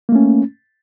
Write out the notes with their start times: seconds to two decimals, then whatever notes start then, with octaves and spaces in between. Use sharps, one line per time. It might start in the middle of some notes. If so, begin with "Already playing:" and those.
0.09 A#3
0.12 A3
0.15 C#4